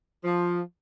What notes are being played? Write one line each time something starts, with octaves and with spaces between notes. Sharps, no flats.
F3